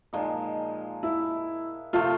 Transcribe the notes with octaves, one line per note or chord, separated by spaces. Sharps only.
A#2 F3 G#3 D#4
E4
C3 F3 A3 C4 F4